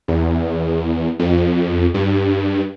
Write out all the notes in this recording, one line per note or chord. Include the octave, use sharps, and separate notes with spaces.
E2
F2
G2